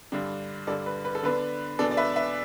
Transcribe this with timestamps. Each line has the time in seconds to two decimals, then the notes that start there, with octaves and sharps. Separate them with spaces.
0.12 G2 D3 G3 D4
0.67 G2 D3 G3 A4 D5
0.86 B4
1.05 B4
1.15 A4
1.23 D3 B3 D4 B4
1.79 E2 B2 B3 D4 A4 D5
1.91 D5
1.97 B4 E5
2.16 B4 E5